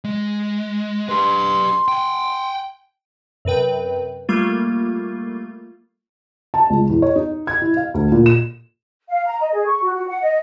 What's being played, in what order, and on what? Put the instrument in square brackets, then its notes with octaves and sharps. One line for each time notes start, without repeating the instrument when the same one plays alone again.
[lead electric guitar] G#3
[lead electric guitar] G4 B4 [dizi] C6
[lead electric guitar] G5 G#5
[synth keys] F#2 C3 B4 G5
G3 A3 A#3 F4
[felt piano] A5
C#2
E2
C#5
D#4
G#6
E4
F5
D2
A#2
E7
[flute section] F5
A#5
D#5
G#4
C#6
F#4
F#4
F#5
D#5